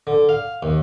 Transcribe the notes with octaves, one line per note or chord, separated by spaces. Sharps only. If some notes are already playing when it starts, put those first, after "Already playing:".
D3
F5
D#2